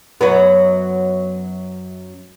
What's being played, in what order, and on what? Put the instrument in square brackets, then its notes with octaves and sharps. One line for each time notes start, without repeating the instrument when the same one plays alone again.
[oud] F#2 F#3 B3